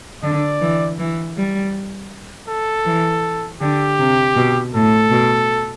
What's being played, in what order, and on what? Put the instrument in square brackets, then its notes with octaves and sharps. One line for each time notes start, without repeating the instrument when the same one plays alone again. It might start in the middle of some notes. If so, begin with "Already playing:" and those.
[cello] D3 [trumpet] D5
[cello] E3
E3
G3
[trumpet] A4
[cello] E3
[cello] D3 [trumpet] G4
[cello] C3
B2
[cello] A2 [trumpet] A4
[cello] B2